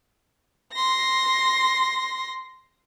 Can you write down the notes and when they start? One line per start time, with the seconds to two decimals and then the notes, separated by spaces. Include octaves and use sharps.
0.73 C6 A#6